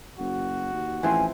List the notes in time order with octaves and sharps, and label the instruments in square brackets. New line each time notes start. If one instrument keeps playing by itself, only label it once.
[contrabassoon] F#1 [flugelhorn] F#4
[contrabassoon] D#2
[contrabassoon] A1 [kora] E3 F3 C4 [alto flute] G#5